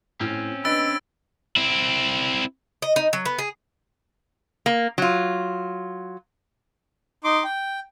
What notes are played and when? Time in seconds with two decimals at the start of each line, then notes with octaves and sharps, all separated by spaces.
0.21 A2 C4 C#4
0.65 D4 B4 D#5 B5 E6 F#6 A6 D7
1.56 C4 E4
2.82 D#5
2.96 D#4
3.13 F#3
3.25 B3
3.39 G#4
4.66 A#3
4.98 F#3 F4
7.24 D#4 C6 D6
7.44 G5